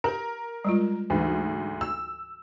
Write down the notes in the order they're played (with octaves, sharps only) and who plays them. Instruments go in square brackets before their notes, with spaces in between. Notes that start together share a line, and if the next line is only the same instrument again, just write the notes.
[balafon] G4 B4 [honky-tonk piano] A#4
[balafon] G3 G#3 F4
[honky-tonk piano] D2 G#2 [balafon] E3
[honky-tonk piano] E6